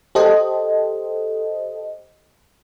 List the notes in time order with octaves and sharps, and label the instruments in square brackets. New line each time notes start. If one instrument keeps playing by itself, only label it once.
[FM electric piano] G4 A4 C5 D#5